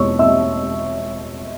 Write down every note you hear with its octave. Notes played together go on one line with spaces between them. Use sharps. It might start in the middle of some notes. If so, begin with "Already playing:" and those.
Already playing: E2 B2 G#3 C#5 C#6 E6
E5 E6